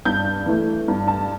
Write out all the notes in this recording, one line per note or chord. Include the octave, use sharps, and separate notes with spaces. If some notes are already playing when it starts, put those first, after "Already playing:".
G2 G6
E3 A3
G2
A5